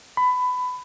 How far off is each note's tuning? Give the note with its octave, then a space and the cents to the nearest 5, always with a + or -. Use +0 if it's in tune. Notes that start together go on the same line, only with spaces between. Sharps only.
B5 +20